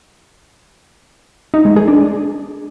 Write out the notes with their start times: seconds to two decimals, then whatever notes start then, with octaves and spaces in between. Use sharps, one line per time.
1.54 D#4
1.65 G#3
1.76 G#4
1.88 D4